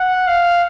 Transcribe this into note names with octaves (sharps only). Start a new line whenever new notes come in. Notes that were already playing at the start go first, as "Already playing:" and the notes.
Already playing: F#5
F5